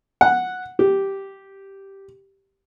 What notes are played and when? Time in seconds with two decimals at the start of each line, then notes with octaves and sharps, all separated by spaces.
0.21 F#5
0.79 G4